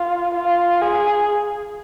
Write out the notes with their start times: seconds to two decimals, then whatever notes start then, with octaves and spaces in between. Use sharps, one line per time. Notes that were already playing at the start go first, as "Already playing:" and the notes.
Already playing: F4
0.34 F4
0.81 G#4